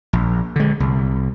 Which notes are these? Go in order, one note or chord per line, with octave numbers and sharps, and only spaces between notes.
A#1
D3 G#3
C2